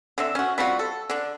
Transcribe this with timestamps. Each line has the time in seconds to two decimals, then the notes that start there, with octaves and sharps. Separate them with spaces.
0.18 D3 C4 E5
0.35 C#4 F#4
0.58 G3 C4 F4 F#4
0.79 A4
1.10 D3 D4